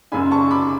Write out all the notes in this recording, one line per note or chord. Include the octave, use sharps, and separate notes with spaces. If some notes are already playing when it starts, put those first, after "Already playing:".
F#1 F#2 C#3 G#5 B5
A5 C#6
B5 D6